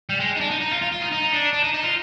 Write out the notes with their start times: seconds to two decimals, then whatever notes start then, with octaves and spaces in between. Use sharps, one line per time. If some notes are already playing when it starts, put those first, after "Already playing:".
0.09 G3
0.20 G#3
0.36 D#4
0.40 D4
0.50 D#4
0.61 D#4
0.71 F4
0.82 F4
0.92 F4
1.02 D#4
1.12 D#4
1.33 D4
1.53 D4
1.63 D#4
1.74 D#4
1.83 F4